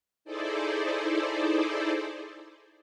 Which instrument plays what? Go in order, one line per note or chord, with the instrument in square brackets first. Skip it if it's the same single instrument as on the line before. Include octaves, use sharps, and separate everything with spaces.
[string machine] D#4 E4 G#4 A4 C5 D5